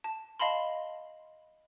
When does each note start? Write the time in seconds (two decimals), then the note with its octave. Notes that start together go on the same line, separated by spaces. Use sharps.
0.04 A5
0.40 D#5 F5 A5 B5 C6